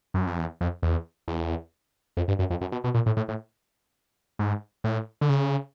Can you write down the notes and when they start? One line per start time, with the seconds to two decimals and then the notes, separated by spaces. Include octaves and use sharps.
0.14 F#2
0.27 F2
0.39 E2
0.61 F2
0.83 E2
1.28 E2
2.17 F2
2.28 G2
2.39 F#2
2.50 F2
2.61 F#2
2.72 B2
2.84 B2
2.94 A#2
3.06 A2
3.17 A2
3.29 A2
4.39 G#2
4.84 A2
5.21 D3
5.29 C#3